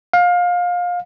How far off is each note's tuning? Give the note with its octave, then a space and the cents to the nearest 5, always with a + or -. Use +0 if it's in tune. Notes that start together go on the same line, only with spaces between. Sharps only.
F5 +25